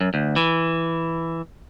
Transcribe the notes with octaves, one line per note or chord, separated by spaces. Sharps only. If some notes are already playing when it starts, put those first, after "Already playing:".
F#2
D2
E3